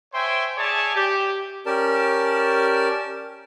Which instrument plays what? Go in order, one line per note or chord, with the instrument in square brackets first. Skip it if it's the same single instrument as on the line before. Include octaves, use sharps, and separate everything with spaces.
[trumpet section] C5 C#5 E5 G5 G#5 C6
G#4 C#5 D5 E5 G#5 A5
G4
[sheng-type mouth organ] C#4 G4 A#4 D5 A5